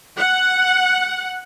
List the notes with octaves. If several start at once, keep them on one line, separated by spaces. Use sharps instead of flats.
F#5